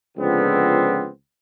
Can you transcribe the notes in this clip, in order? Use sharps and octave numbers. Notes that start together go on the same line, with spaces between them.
C#2 D3 F3 B3 C4